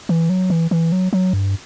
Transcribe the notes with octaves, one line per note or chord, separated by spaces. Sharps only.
E3
F#3
E3
E3
F#3
F#3
G2